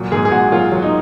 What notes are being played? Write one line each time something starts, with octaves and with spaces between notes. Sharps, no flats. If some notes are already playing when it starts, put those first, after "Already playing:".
Already playing: A#2 F#3
G#2 G#4
G#4
G#2 F#4
F#3 F4
F#3
D#4